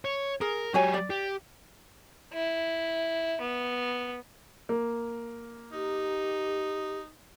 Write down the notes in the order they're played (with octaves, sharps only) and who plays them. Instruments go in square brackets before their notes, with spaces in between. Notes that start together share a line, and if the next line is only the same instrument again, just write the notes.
[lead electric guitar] C#5
[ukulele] G#4 [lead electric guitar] A#4
[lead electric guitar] F#3 G4 [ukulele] F#4 C#5 G#5
[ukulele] D5
[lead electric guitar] G4
[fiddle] E4
B3
[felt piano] A#3
[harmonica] D#4 [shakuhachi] G4